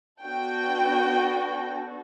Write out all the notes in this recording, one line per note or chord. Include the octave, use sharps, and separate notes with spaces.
B3 D4 F#4 A4 G5